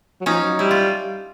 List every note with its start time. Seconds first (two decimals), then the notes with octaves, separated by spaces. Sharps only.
0.21 F#3
0.26 F3 C#4 D#4
0.43 F#3
0.59 G3 E4
0.71 F4